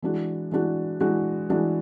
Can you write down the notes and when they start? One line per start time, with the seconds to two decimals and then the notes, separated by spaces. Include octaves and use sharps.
0.02 E3 G#3 D4 F#4
0.52 E3 G#3 D4 F#4
1.01 E3 G#3 D4 F#4
1.50 E3 G#3 D4 F#4